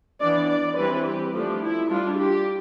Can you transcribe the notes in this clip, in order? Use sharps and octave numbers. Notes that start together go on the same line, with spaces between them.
E3 B3 D4 D5
D5
E3 G3 C4 B4
G4
F3 A3 D4 G4
E4
G3 D4 F4
G4